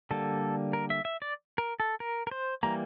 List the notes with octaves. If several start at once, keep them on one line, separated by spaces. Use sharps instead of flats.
D3 G3 A#3 A4
A#4
E5
E5
D5
A#4
A4
A#4
A#4
C5
E3 G3 A#3 A#5